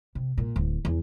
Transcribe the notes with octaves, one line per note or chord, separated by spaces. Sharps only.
C3
A#2
D1
E2